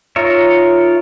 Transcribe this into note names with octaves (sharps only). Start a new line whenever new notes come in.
D#4 F4 A#4 C#5 E5